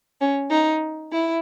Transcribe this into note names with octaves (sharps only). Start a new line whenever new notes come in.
C#4
D#4
E4